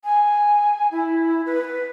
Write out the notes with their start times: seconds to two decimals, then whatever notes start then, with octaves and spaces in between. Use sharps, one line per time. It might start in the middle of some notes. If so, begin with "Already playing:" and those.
0.04 G#5
0.91 E4
1.46 B4